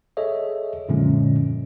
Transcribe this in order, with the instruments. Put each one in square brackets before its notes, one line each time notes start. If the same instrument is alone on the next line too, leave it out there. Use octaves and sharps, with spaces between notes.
[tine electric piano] G#4 A4 C#5 D#5 E5
F#2 A#2 D3 F3 G#3 C#4